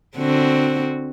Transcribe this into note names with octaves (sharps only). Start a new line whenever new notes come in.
D3 C4 F#4